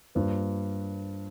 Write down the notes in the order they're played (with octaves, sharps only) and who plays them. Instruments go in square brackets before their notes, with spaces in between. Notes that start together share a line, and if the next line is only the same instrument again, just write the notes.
[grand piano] G2 [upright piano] A#3 D4 F4 C5